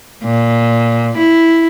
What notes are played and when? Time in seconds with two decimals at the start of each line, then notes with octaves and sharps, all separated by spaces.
0.24 A#2
1.17 E4